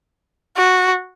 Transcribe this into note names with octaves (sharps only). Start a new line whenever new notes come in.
F#4